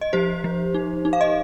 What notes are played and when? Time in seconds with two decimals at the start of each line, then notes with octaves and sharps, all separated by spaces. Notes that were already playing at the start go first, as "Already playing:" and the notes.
0.01 D#5
0.13 F3 G4 C5
0.44 F3
0.74 D#4
1.05 D#4
1.13 F5
1.21 D#5